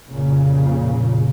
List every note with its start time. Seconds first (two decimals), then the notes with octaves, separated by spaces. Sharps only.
0.10 F1 A#2 C#3